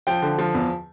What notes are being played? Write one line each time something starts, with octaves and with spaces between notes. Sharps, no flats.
F3 G5
D3
F3
E2